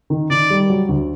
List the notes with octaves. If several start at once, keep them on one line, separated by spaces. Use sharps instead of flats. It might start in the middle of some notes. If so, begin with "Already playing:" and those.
D#3
D#3 D5
G3
F#3
D2